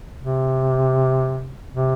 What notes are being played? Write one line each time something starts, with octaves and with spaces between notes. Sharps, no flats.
C3
C3